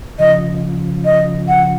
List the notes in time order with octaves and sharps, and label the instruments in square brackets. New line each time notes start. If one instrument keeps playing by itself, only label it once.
[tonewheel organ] C#3 F3 [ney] D#5
[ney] D#5
F#5